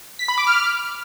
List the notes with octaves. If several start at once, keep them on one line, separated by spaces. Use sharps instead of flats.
B6
B5
D6
F6